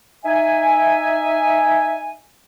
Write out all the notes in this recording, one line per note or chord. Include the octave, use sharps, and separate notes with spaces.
D#4 E5 G#5